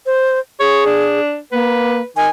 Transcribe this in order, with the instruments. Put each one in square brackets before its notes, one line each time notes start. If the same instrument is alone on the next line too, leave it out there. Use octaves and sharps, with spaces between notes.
[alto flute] C5
[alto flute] G#4 [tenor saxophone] C#5
[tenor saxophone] D4
[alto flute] A#3 [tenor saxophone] B4
[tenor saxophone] D#3 [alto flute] G#5